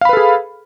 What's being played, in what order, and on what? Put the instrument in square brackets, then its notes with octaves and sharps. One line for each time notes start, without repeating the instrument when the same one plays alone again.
[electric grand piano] F5
B5
B4
A4
G#4